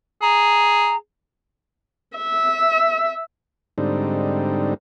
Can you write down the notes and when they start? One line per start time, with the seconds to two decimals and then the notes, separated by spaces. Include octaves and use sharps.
0.22 G#4 A#5
2.18 E5
3.78 G#2 D3 G3 C4 D#4